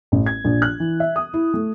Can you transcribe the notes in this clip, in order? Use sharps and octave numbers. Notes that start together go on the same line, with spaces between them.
A1
G#6
A#1
F#6
E3
E5
D#6
E4
A3